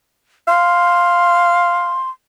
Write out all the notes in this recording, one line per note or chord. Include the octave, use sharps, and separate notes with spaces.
F5 C6